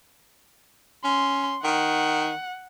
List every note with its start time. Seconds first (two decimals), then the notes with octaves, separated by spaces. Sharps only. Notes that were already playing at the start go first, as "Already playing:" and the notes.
1.04 C#4 C6
1.64 D#3 F#5